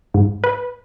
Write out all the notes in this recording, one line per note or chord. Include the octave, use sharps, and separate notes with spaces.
G#2
B4